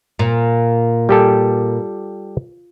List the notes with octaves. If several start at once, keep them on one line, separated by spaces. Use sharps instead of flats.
A#2
G3 G4 A4